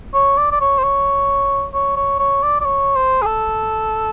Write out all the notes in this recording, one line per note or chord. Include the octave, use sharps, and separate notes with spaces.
C#5
D5
D5
C#5
C5
C#5
C#5
C#5
C#5
D5
D5
C#5
C5
G#4
A4